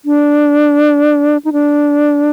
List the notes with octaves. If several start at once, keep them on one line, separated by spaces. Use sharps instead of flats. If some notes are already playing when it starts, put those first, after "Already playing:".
D4
D#4
D4